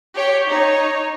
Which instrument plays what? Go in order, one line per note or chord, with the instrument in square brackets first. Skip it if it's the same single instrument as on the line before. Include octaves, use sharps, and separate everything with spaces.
[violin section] G4 C#5
D#4 C#5